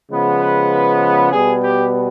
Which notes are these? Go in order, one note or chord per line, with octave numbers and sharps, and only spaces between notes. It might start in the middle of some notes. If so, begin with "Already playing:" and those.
C#3 F3 G#3 B3
B4
B4
B4
B2 G3 B3 G#4
G4